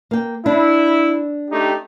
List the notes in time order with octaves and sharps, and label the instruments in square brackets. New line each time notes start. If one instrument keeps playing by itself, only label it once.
[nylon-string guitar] A#3 G5
[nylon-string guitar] D4 [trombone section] E4
[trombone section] A3 D#4 G4